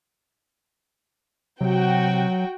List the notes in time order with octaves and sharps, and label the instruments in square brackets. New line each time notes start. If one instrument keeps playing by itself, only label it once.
[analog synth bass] C3 [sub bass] F#3 [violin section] F#4 G5